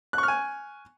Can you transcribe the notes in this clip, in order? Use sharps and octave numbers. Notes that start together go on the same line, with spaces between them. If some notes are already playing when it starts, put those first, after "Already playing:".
G#5 C#6 F6 F#6